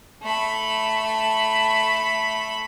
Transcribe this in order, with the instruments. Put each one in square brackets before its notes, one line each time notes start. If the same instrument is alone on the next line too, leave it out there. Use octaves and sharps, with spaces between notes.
[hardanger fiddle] A3 B5